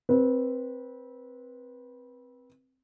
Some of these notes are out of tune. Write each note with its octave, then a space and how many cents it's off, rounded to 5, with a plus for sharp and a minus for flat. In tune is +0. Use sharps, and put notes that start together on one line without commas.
C4 +0 B4 -25